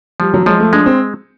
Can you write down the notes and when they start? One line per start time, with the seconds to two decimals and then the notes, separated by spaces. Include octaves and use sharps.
0.20 F3 G3
0.34 F#3
0.46 F3 G#3
0.60 A3
0.73 G#3 D4
0.86 C4